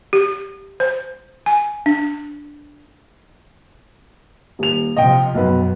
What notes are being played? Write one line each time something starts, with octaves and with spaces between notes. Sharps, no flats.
G4
C5
G#5
D4
D#1 F7
C3 F3 D#5 G5
B1 F#2 B4